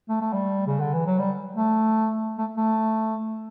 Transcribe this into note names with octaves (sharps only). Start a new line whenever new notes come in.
A3
A3
G3
C#3
D3
E3
F#3
G3
A3
A3
A3